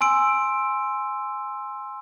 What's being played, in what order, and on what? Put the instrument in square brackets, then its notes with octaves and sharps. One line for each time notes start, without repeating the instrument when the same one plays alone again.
[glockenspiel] G#5 C6 E6 D7